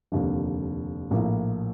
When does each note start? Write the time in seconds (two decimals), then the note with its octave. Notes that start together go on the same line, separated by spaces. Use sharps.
0.12 F1 D#2 D3 F3
1.11 A#1 A2 F3 A#3